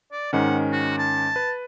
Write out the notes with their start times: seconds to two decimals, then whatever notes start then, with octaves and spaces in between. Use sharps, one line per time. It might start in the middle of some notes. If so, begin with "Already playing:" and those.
0.12 D5
0.33 G#2 D#3 C#4 F#5
0.72 F#4
0.98 A5
1.36 B4